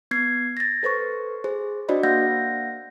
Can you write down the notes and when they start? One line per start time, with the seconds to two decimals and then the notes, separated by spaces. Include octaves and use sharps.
0.11 B3 G#6 C7
0.57 A6 A#6
0.83 A4 B4 C5 C#6
1.44 G#4 C5
1.89 D4 F#4 C5 D5 D#5 B5
2.03 A#3 F5 F#5 G6 A#6